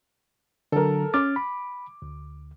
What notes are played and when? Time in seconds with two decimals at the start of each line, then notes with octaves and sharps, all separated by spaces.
0.72 D3 F#3 A4 A#4
1.14 C#4 D6 F6 A6
1.36 B5
2.02 D2